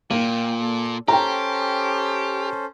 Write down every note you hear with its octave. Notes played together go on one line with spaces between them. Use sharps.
A#2 A#3 G5
A4
C#4 G4 A4 C5 G5 A#5